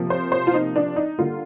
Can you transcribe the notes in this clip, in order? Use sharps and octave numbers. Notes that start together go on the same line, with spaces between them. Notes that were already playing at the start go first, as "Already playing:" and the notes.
Already playing: C3 F3 A#3
C5
C5
F4
D#4
D4
D#4
D3 G3 A#3 F4